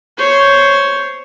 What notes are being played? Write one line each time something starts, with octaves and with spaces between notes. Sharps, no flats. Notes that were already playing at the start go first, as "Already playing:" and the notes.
C5 C#5